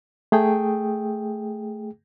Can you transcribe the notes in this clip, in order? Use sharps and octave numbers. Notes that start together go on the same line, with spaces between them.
A3 G#4 G5